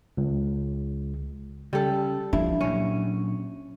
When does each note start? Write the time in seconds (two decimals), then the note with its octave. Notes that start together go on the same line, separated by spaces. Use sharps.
0.17 C#2
1.73 C#3 G3 A4
2.33 F3 D4 E4
2.61 A#2 F#3 C#4